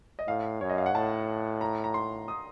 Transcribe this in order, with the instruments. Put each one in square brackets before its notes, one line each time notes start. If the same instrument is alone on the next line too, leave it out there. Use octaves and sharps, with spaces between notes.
[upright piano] D#5
[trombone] A2 [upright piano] F5
[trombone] F#2 [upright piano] C#5
[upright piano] D#5
F5
F#5
[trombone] A2 [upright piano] A5
[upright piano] A#5
A#5
C6
D#6